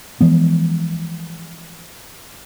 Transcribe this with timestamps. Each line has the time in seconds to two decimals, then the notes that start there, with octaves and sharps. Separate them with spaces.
0.21 E3 F3 G#3 B3